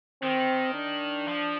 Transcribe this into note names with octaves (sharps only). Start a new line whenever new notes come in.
D#3 C4
D4
F3